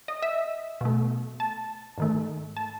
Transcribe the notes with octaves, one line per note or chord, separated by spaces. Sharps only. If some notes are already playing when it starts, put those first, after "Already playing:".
D#5
E5
B2 A3
A5
G#2 D#3 A3
A5